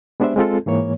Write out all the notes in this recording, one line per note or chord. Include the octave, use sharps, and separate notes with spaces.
G#3 B3 D4 G4 C5 E5
G#3 C4 F4 A4
G#2 E3 A#3 C#5